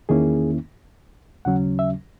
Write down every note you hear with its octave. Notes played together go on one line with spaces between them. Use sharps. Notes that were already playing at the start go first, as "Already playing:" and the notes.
E2 D#3 A#3 C#4 E4 G#4
D#2 C#3 F#3 C#4 F#5
E5